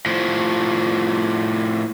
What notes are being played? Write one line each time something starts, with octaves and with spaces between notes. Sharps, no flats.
A2 F3